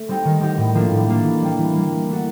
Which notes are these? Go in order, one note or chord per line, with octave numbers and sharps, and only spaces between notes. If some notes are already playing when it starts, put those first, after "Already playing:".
Already playing: A3
G3 C4 D#4 G4
D#3
G3 C4 D#4 G4
A2
F3 A#3 D4
A2
F3 A#3 D4
E3
G3 A#3
E3
G3 A#3
E3
A3 D4 F#4